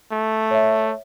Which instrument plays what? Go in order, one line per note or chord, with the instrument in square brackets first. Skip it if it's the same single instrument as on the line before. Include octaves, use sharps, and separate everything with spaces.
[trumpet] A3
[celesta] C#5 E5